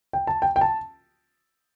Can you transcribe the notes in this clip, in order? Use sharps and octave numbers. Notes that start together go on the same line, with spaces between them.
G5
A5
G5
G5
A5